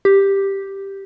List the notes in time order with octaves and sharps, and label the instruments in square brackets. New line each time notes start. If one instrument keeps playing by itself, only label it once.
[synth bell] G4